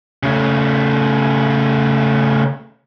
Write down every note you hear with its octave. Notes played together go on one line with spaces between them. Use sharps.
C#3 A3